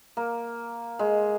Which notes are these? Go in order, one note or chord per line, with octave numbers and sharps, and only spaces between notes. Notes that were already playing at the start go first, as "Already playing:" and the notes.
A#3
G#3